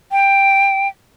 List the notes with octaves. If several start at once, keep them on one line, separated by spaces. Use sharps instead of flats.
G5